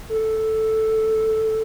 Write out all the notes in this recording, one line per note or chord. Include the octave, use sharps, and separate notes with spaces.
A4